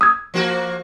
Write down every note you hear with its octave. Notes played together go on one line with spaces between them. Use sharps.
D#6 E6 G#6
F3 A#3 F#4